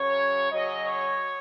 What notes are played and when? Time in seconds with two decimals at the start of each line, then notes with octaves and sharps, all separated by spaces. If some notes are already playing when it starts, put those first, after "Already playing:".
Already playing: F#2 C#3 F#3 C#4 C#5
0.52 C#3 F#3 C#4 D#5
0.84 C#5